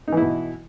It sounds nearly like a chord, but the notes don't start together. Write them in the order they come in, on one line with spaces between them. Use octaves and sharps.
D#4 E3 E4 B2